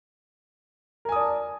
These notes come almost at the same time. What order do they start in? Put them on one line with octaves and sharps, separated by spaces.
A#4 G#5 D#6 D5 A5